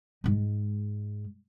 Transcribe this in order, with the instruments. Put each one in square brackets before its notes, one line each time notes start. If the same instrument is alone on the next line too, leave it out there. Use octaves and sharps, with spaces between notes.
[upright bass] G#2 G#3